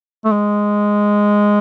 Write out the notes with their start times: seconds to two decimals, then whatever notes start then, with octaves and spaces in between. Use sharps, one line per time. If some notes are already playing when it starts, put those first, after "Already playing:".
0.25 A3
0.31 G#3